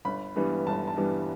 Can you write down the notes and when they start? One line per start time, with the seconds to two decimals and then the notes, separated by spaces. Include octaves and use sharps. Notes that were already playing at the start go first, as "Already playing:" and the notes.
0.05 G1 B5
0.36 G2 E3 G3 B3
0.67 G1 A5
0.88 A5
0.97 G2 E3 G3 B3